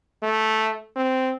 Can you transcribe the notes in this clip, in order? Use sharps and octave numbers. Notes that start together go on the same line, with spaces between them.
A3
C4